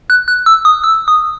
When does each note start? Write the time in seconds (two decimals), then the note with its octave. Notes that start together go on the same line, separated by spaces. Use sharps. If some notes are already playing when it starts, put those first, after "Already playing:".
0.10 F#6
0.28 F#6
0.46 E6
0.65 D#6
0.84 E6
1.08 D#6